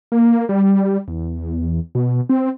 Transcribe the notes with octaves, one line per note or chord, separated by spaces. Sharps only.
A#3
G3
E2
B2
C4